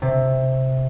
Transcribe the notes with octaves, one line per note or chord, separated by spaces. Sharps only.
C3